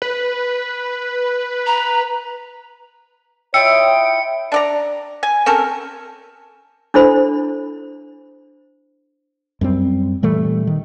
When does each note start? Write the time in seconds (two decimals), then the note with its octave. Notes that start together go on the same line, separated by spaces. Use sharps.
0.02 B4
1.67 A#5
3.54 E4 F4 C#5 D#5 G5 C#7
4.52 D4 D5 A#5
5.23 G#5
5.46 C4 C#4 A4 A#4
6.94 D4 E4 A4 C5 B5
9.61 F#2 G3 C4
10.22 A#2 E3 G3 A3
10.67 D#3